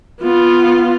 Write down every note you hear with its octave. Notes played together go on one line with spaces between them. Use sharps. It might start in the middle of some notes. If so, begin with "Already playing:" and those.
B3 F4